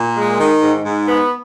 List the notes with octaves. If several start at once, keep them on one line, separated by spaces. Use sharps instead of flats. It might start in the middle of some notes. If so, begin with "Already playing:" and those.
Already playing: A#2
G#3
D#3
G#2
G#2
B3